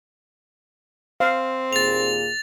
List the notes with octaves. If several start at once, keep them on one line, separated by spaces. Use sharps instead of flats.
C4 F5
D#2 A#2 G#4 A6 F7